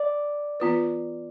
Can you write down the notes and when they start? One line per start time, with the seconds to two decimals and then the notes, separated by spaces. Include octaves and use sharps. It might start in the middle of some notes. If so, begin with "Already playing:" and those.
Already playing: D5
0.60 E3 B3 F4 B4